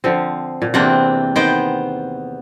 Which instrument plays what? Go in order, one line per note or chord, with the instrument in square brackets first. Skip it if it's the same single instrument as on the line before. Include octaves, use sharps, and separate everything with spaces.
[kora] D3 F3 C4
A#2
[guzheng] E2 C4 F#5 [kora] C3 A#3 D4
[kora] D#3 [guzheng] B3 C5 G5